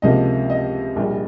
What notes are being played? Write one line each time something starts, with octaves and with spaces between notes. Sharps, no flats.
C#2 C3 F3 A#3 D#5
D#5
A#1 A#2 G3